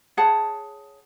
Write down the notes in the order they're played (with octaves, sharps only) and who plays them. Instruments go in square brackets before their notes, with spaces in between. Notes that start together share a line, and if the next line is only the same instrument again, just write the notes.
[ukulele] G#4 C#5 F#5 A5